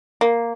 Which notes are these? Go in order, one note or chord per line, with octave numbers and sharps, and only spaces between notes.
A#3